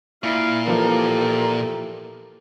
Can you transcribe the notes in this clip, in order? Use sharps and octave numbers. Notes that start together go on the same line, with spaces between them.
A#2 E4 F5
E3 F3 G4 A4 A#4